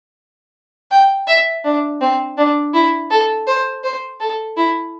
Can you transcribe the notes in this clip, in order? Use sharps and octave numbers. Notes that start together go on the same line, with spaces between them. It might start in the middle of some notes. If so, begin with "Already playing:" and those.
G5
E5
D4
C4
D4
E4
A4
C5
C5
A4
E4